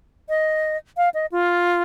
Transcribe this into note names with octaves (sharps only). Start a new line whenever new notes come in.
D#5
F5
D#5
F4